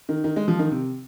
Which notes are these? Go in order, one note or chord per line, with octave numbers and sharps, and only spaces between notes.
D#3
D#3
G#3
F3
D#3
C3